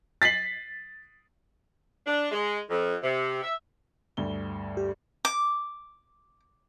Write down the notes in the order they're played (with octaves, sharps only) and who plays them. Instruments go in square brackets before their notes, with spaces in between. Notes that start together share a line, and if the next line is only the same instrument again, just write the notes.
[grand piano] A6 B6 C7 F#7
[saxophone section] D4
G#3
F2
C3
E5
[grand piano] D2 G2 G7
[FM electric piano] G4
[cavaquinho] D6